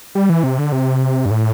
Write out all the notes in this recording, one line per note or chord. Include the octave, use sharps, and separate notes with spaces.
G3
E3
C3
D3
C3
G2
A2